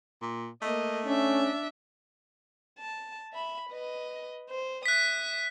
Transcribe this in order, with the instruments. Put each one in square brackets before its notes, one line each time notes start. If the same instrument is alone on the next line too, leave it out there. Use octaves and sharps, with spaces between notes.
[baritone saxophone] A#2
[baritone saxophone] A3 [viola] A#3 D#5
[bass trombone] C#4 [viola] D4 E5
[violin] A5
E5 B5
B4 D#5
C5
[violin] E5 D#6 [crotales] F#6 B6